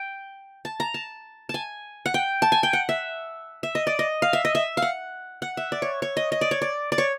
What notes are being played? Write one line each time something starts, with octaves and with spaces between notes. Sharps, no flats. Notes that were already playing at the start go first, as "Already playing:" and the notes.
Already playing: G5
A5
A#5
A5
G#5 A5
F#5
G5
A5
G#5
G5
F#5
E5
E5
D#5
D5
D#5
F5
E5
D#5
E5
F5
F#5
F#5
E5
D5
C#5
C#5
D#5
D#5
D5
C#5
D5
D5
C#5